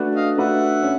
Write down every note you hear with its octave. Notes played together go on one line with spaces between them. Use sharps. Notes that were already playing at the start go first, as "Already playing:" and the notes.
Already playing: A3 D4 F#4 B4
D#5 F5
A3 D4 F#4 B4 E5 F#5
C#4